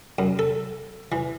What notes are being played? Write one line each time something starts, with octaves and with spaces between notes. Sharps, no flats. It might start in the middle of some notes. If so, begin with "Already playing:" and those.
F#2
A4
E3